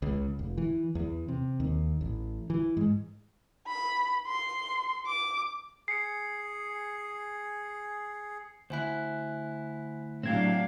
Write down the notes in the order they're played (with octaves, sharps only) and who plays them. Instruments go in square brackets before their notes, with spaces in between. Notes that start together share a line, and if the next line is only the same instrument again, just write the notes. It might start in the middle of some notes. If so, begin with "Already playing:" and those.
[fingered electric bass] C#2
F1
E3
E2
C3
D#2
A1
E3
G#2
[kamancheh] B5
C6
D6
[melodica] G#4 [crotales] C7 C#7
[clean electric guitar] D2 E4 [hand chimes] C5 G#5 F#6
[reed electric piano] A2 G#6 [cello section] F#3 D4 F5 [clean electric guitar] C4 E4 G4